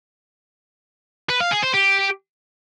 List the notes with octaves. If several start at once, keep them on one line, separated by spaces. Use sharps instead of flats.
B4
F5
G#4
C5
G4